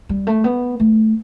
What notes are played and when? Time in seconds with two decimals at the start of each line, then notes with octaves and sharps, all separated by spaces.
0.09 G3
0.27 A3
0.44 B3
0.80 A3